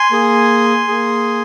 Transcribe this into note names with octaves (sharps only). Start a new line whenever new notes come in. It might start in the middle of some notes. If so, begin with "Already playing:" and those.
Already playing: G#5 C6
A#3 G#4
A#3 G#4